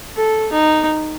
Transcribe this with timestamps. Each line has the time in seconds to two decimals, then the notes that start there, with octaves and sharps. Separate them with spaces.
0.16 A4
0.53 D#4